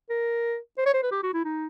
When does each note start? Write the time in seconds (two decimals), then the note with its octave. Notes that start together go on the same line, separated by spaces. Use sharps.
0.10 A#4
0.78 C5
0.86 C#5
0.94 C5
1.03 B4
1.12 G4
1.23 F#4
1.34 E4
1.45 D#4